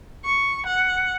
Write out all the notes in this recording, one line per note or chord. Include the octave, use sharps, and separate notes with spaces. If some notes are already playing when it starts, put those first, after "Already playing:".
C#6
F#5